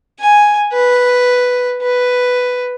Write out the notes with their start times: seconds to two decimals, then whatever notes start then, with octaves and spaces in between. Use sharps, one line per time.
0.20 G#5
0.73 B4
1.81 B4